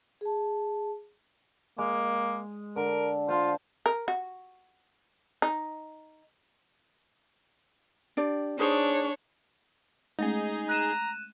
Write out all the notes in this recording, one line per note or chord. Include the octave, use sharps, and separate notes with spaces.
G#4 A5
G#3 A#3
D3 A#4
F4 C5 F5 A5
A#4
F#4
D#4
D4 G4 D5
D4 D#4 G#4 C5 C#5
G#3 A3 C#4 D#4 G#4
A#5 F#6 D#7 E7